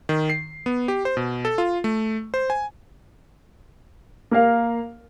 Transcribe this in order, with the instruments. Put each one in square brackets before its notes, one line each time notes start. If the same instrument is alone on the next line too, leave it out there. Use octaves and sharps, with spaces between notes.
[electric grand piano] D#3
C7
B3
G4
C5
B2
A4
F4
A3
C5
G#5
[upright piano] A#3 A#4 F5